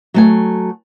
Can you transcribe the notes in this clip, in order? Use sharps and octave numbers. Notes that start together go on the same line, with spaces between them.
F#3 A3 G#5